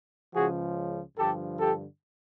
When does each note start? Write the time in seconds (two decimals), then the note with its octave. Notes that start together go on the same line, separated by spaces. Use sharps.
0.33 C#2 C#3 F3 F#4 G#4
1.17 G2 D3 F3 G4 A4
1.59 G4 A4